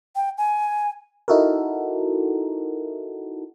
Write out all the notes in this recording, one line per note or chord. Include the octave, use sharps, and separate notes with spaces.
G5
G#5
D#4 E4 F#4 A4 A#4